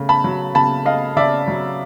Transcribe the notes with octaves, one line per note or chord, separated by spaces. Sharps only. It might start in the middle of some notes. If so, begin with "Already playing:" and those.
Already playing: C#3 A3
A5 B5
F#3
C#3 A5 B5
A3 D#5 F5
C#3 D5 E5
F#3